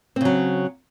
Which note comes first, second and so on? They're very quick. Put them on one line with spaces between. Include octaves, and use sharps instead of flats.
C4 C#3 F#3